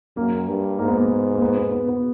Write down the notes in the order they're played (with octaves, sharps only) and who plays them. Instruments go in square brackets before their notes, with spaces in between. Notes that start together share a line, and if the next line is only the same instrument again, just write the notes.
[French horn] F#2 [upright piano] A#3
[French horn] G2
[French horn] G#2 [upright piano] A#3
[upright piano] B3
A#3
A#3
B3
B3
B3
B3